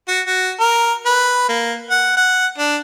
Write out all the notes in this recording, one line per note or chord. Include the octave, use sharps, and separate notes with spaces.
F#4
F#4
A#4
B4
A#3
F#5
F#5
D4